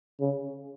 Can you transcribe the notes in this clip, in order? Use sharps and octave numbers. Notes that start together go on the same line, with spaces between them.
C#3